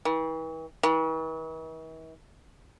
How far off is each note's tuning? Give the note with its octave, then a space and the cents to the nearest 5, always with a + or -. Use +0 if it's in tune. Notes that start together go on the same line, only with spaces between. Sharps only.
E3 -40
E3 -45